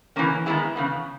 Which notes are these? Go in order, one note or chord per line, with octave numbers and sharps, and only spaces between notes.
C#3 E3 A#3 C#4
D#3 G#3 B3 E4 G#4
C#3 E3 B3